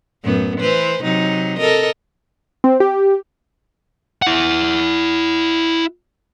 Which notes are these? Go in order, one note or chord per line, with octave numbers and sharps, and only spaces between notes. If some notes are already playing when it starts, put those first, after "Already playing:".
F#2 A2 B3
E3 B4 C5
C3 F#3 D#4
A4 A#4 D#5
C4
G4
E4 F#5